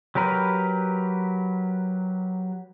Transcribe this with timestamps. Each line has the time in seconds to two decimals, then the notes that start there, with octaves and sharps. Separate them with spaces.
0.15 F#3 G4 A#4 B4